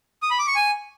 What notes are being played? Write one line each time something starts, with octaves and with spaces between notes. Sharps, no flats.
D#6
B5
D6
C#6
G#5